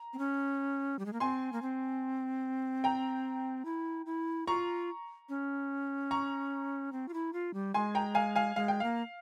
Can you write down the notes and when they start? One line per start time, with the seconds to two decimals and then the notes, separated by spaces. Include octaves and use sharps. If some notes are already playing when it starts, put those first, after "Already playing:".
Already playing: A#5
0.13 C4
0.19 C#4
0.99 G3
1.06 G#3
1.13 A#3
1.20 C4 G#5 C6
1.53 A#3
1.62 C4
2.84 G5 A#5
3.65 E4
4.06 E4
4.47 F4 A#5 C#6
5.29 C#4
6.11 A#5 C#6
6.92 C4
7.08 F4
7.14 E4
7.33 F4
7.54 G3
7.74 G#3 G#5 C6
7.95 G5 A#5
8.15 F5 G#5
8.36 F5 G#5
8.56 G#3 F5
8.68 G5
8.80 A#3 F5